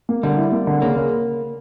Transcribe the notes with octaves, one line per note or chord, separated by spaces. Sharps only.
A#3
D3 G3
E4
A#3
D3
C#3 A#3
C#3